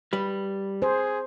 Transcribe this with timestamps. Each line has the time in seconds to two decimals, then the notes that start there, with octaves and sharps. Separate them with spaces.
0.13 G3 B4
0.82 G#4 C5